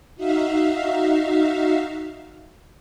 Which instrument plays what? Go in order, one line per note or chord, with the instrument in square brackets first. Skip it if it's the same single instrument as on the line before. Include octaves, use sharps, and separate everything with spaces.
[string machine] D#4 F#4 E5 F5